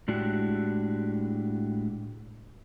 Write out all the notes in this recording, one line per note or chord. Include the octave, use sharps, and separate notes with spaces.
A2 G#3 D4 E4 F#4 G4